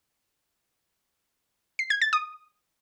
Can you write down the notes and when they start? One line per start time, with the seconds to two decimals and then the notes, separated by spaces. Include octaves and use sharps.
1.79 C7
1.90 G#6
2.02 A6
2.13 D#6